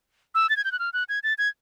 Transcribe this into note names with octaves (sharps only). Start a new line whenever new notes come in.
E6
A6
G#6
G6
F#6
F6
F#6
G#6
A6
G#6